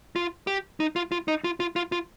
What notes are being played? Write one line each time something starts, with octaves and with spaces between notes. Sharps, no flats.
F4
G4
D#4
F4
F4
D#4
F4
F4
F4
F4